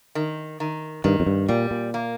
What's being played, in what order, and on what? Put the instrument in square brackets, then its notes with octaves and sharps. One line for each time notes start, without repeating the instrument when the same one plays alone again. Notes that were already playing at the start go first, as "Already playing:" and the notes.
[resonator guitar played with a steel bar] D#3
D#3
[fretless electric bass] G2 [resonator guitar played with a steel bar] D#3
[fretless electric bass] F2
G2
[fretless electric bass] A#2 [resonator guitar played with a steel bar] G3
[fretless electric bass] A#2
[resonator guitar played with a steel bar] A#3